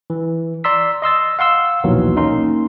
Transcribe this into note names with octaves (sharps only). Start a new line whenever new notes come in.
E3
D5 A#5 C6 E6 B6
D#5 C6 E6 A6
F5 F#5 C6 E6
A#1 D#2 B2 D#3 E3 F#3
A#3 C#4 D#4 A#4 C6